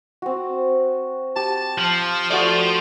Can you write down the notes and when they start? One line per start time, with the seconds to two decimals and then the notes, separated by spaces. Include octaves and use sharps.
0.22 C4 F#4
1.36 G4 A5
1.78 F3
2.30 A3 F#4 D5